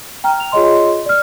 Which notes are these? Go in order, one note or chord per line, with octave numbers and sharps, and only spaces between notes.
G5 A#5 F6
F7
F4 G#4 C#5 D#5 C6
D5 F6